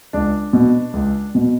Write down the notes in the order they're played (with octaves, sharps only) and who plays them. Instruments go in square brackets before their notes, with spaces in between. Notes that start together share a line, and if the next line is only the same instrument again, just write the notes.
[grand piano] C#2 D4
B2
C#2
B2